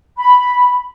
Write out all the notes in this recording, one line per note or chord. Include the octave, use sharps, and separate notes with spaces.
B5